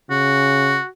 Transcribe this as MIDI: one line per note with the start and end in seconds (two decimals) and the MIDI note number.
0.10 0.81 49
0.10 0.86 66